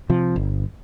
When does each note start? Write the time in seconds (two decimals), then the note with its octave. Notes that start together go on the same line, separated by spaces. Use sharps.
0.09 C3 F3
0.36 G1